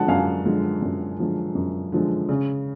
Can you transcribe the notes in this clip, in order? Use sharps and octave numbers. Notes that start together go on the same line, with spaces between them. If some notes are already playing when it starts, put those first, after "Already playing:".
Already playing: D3 F3 G#3 F#5 A5
F#2 F5 G#5
D3 F3 G#3
F#2
D3 F3 G#3
F#2
D3 F3 G#3
C#3